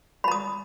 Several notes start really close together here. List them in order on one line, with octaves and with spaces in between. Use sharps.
B5 A#5 D#6